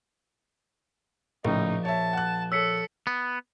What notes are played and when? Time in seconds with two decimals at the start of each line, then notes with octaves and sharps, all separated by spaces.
1.45 A#1 A2 C#3 D#4
1.85 C#5 E5 A5
2.13 F#5 F#6
2.52 A4 C#5 E6 B6 C#7
3.07 B3